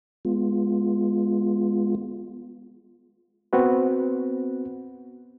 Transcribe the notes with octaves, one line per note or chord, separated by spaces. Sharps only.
G#3 B3 F4
B3 C4 F#4 B4